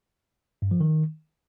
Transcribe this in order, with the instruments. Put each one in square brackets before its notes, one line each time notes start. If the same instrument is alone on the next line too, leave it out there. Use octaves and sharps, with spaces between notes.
[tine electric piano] G2
F3
D#3